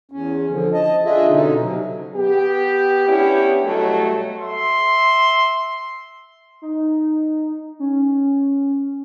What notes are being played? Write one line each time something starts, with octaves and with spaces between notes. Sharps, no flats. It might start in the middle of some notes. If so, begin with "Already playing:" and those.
E2 C#4
D3 F3
D#5 A5
D4 F4 G#4 D#5 E5
B2 D3 C#4 D#4
C3 F#3
B3 G4
B3 C#4 D4 E4 G4
B2 F#3 G3 A3
E5 C6
D#4
C#4